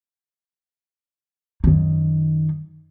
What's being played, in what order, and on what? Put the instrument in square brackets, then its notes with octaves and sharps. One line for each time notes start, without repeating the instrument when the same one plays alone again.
[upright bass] F#2 D#3